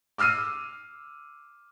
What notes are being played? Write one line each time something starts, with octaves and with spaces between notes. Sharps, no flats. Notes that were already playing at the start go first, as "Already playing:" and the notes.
D6 E6 F6 C7 D#7